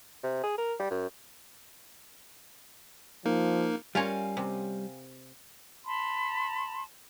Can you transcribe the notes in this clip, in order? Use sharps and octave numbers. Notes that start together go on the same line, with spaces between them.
C3
G#4
A#4
G3
F#2
F3 A#3 D#4 A#4
G3 C#4 F4 A#4 C#5 F5 G#5
C3
A5 B5 C6